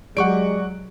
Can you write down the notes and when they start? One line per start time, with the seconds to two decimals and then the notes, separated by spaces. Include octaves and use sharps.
0.17 F#3 G#3 G4 D5 F#5 C#6 D7